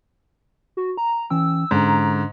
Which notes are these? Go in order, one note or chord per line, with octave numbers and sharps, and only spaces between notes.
F#4
A#5
E3 C#4 G5 E6
G#2 D3 C#4 A4 A#5